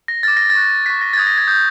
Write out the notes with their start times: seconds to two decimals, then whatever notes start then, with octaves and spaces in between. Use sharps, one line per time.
0.08 A#6
0.23 D6 F6 A6
0.37 A#6
0.50 A6
0.55 C#6 F#6
0.85 F#6 B6
0.90 C#6
1.02 A#6
1.13 A6
1.17 D#6 F#6 G#6
1.27 A#6
1.38 G#6
1.47 D#6 G6